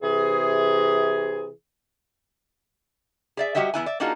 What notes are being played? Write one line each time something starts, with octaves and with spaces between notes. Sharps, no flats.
C3 E3 G#4
G#4 D5 E5
F#3 G3 F#4 G4 D#5 E5
E2 B3 E4 G#5
D5 E5
A#3 D4 D#4 F4 F#4 G#4